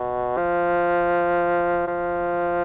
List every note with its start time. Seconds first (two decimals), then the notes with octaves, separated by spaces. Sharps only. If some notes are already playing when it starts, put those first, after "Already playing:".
Already playing: B2
0.37 F3
1.87 F3